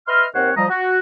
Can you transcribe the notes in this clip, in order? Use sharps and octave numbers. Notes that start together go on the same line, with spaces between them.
B4 D#5 E5 C6 F6
D#2 C4 A#4 C5 C#5 F#5
F3 G3 D#5 A#5
F#4